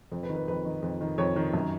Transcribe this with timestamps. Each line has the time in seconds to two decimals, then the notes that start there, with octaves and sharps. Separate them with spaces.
0.12 F2
0.23 B4
0.29 D#3
0.35 B4
0.48 F2 B4
0.65 D#3
0.83 F2
1.01 D#3
1.18 F2 C#5
1.36 D#3
1.54 F#2